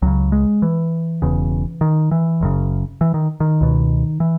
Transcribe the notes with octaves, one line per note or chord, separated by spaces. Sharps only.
C#2 C#3 F#3
G#3
E3
E1 E2 C#3
D#3
E3
F#1 F#2 C#3
E3
D#3
D#3
C#2 B2
E3